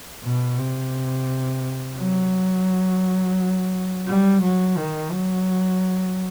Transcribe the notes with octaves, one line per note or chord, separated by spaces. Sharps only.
B2
C3
F#3
G3
F#3
D#3
F#3